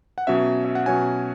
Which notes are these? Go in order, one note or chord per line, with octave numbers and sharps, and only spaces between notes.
F#5
B2 F#3 C#4 E5
E5
F#5
B2 F#3 C#4 G#5